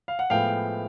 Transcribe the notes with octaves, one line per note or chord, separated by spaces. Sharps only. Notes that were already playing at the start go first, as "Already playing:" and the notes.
F5
F#5
A2 F3 G#3 B3 F5 G5